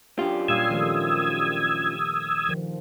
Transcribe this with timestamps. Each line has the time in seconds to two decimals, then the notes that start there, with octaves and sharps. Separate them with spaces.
0.19 F#2 D4 F4 G4
0.48 A#2 G3 F5 D#6 E6 G#6
0.70 D#3 F3 A3
2.49 D#3 F3